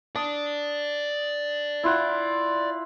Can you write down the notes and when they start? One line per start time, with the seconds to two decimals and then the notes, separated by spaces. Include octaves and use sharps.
0.15 D5 A5 D#6
1.83 E4 F4 F#5